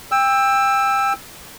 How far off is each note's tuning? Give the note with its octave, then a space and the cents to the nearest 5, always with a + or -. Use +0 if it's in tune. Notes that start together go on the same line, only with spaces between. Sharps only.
G5 +25 E6 +0